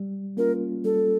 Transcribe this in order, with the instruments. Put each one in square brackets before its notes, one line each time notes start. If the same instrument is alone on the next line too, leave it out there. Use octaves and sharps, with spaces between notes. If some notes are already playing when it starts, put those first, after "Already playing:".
Already playing: [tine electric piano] G3
[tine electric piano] A#3 C#4 F4 [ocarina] A#4
[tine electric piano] G3 [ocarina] A4